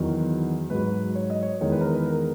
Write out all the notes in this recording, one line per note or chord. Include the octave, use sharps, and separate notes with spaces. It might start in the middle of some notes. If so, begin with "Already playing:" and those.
Already playing: E2 D#3 F#3
G#2 F#3 B4
C#5
D#5
C#5
E2 D#3 G#3 C#5
B4
A#4
B4
A#4